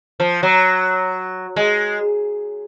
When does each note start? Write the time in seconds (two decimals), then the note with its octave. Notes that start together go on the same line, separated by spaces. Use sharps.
0.20 F3
0.43 F#3
1.56 G#3